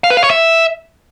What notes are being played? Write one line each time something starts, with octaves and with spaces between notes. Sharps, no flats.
F5
B4
F5
C#5
E5